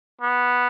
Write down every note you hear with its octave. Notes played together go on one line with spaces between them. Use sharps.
B3